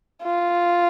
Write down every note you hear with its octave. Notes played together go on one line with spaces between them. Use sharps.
F4